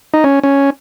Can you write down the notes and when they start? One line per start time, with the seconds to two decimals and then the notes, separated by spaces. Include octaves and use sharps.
0.14 D#4
0.24 C#4
0.43 C#4